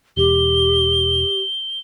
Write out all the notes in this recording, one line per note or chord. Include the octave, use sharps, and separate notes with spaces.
E1 G4 G7